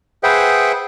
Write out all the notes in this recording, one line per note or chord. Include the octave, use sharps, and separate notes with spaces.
G#4 B4 C5 E5 F#5 G5